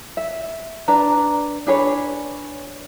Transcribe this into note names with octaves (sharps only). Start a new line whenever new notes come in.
E5
D4 B4 A#5
D4 G#4 B4 C#5